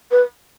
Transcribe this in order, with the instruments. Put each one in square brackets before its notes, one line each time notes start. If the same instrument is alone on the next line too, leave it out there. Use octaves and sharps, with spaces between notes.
[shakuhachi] B4